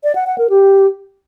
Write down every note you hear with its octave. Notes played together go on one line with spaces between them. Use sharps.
D5
F#5
F#5
A#4
G4